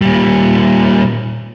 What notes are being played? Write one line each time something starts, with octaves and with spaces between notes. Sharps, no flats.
A#2 G3